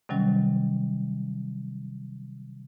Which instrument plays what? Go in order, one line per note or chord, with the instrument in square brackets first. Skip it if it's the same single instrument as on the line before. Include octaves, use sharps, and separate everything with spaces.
[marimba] C3 D#3 F#3 G3 C#4